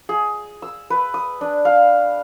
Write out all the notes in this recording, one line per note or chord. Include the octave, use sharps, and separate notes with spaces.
G#4
E6
B4
D#6
D4
F5